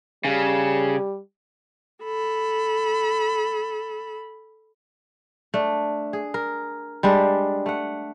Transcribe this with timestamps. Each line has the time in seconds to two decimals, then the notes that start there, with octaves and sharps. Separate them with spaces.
0.25 C#3 G3
2.04 A4 B5
5.54 A3 D4
6.13 G#4
6.34 A#4
7.03 G3 G#3 D4
7.66 A3 F#5